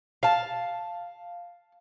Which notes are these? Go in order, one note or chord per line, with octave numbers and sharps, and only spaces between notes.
F5 A5